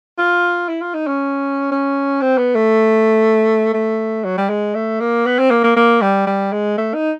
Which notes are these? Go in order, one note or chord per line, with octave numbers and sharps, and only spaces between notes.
F4
E4
F4
D#4
C#4
C#4
C4
B3
A3
A3
F#3
G3
G#3
A3
A#3
B3
C4
A#3
A#3
A#3
G3
G3
G#3
A3
D#4